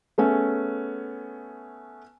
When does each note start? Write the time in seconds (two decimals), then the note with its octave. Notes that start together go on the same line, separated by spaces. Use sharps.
0.18 A3 B3 C#4 G#4